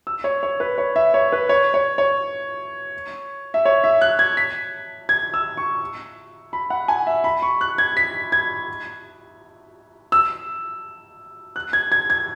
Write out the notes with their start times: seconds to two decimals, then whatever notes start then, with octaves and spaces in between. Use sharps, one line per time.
0.07 E6
0.24 C#5
0.43 C#5
0.60 B4
0.78 C#5
0.96 E5
1.14 C#5
1.32 B4
1.49 C#5
1.74 C#5
1.98 C#5
3.54 E5
3.65 C#5
3.84 E5
4.01 F#6
4.19 G#6
4.37 B6
5.09 G#6
5.34 E6
5.57 C#6
6.53 B5
6.70 F#5
6.88 G#5
7.07 E5
7.24 B5
7.42 C#6
7.61 F#6
7.78 G#6
7.97 B6
8.32 G#6
10.12 E6
11.56 F#6
11.73 G#6
11.92 G#6
12.10 G#6